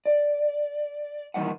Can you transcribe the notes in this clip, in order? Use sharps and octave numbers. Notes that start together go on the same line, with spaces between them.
D5
A#2 D#3 E3 G3 D#5 F#5